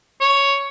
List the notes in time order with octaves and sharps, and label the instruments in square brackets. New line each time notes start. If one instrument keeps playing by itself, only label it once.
[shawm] C#5